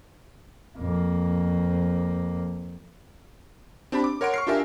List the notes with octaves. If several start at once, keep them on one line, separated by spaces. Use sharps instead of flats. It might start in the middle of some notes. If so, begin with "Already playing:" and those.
F2 A#3
C4 D4 G4 A5 B5
D6
A#4 C#5 F#5 C6 D7
C#6 F6 C7
D4 F4 G4 A#4 E5 G#5